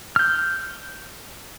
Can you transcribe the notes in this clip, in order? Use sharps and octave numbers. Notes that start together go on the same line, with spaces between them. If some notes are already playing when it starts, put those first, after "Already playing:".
F6 G6